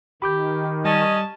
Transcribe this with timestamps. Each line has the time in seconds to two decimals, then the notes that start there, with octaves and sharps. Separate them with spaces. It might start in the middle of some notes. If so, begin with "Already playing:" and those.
0.22 D#3 G4 B5 D6 G6
0.85 G3 C#4 D#5 A5